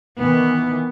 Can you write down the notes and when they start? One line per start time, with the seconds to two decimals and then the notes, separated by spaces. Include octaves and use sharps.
0.18 D#3 E3 B3